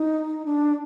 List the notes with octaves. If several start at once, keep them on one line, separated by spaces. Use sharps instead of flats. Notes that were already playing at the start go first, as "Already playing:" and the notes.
Already playing: D#4
D4